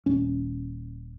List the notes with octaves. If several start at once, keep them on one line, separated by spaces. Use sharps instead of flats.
D#1 C#4